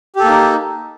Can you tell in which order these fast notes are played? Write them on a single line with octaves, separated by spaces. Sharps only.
G4 A4 A#3 D#4